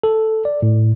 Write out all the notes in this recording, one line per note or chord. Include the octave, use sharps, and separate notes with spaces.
A4
D5
A2